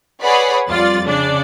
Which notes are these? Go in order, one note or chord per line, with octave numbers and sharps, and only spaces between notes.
G#4 B4 C#5 D5 F#5 B5
F2 G3 F4 D5 A6
C#3 D4 D5